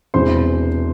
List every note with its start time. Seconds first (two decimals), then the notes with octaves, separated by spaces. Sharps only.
0.14 E1 E2 C3 E3 C5 C6